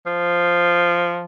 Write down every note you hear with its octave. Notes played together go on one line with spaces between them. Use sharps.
F3